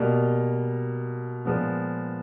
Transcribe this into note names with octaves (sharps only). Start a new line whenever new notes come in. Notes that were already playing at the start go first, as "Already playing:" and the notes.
Already playing: B2 G3 A#3
A#2 F3 G#3 B3